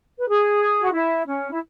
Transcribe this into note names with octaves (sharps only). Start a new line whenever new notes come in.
B4
G#4
F#4
E4
C#4
E4